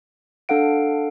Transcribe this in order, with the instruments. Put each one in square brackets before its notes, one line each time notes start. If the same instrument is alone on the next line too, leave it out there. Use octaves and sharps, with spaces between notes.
[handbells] D4 A4 F5 F#5 D7